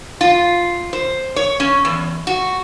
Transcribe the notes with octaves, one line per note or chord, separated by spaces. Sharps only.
F4
C5
C#5
C#4
E2
F#4